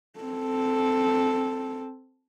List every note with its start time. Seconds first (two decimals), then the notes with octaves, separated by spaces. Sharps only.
0.19 C4 A4